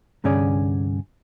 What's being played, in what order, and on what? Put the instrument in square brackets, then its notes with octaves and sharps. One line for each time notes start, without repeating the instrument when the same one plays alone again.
[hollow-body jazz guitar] C2 G2 D3 C#4 G#4 D5